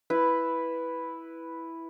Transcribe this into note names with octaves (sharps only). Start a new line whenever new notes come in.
E4 B4